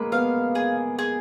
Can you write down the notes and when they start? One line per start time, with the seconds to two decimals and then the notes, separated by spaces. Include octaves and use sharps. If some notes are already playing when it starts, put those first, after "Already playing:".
Already playing: G#3 A#3 B4
0.12 B3 F5
0.55 G#4
0.99 G#4